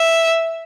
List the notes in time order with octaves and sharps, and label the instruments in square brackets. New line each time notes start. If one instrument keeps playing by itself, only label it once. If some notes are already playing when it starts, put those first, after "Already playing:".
Already playing: [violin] E5